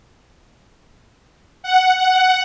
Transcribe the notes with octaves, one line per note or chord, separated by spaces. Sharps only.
F#5
F#5